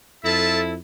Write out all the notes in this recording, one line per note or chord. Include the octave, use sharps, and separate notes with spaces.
F2 E4 F4 A4 E5 A5